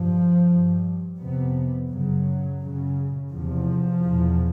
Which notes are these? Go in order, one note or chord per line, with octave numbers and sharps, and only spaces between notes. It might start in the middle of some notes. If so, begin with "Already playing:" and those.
Already playing: G2 F3
G2
F2 C3 B3
F#2 C#3 F#3
F#2 C#3
E2 C3 F3
E2 B2